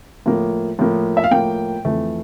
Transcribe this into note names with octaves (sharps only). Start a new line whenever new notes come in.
A2 F3 A#3
A2 F3 A#3
E5
F5
A2 F3 A#3 G5
F2 E3 A3